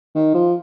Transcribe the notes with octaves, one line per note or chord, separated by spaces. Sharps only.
D#3
F3